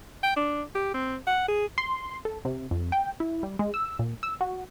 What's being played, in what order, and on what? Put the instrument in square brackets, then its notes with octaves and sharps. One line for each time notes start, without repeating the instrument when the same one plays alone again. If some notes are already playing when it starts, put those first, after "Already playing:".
[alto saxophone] G5
D4
G4
C4
F#5
G#4
[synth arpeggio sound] C6
A4
C3
F2
G5
E4
G3
G#3
E6
A#2
E6
F#4